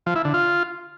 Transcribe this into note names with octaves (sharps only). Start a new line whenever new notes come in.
F3
E4
D3
F4